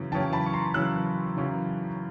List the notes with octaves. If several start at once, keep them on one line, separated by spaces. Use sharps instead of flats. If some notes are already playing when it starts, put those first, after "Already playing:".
Already playing: F#2 C#3 E3
F#2 C#3 E3 G5 A5
A5 B5
C#6
A#5 C6
F#2 C#3 E3 E6 F#6
F#2 C#3 E3